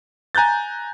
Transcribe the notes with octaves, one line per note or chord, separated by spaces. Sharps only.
G#5 A#5 F#6 G6 A6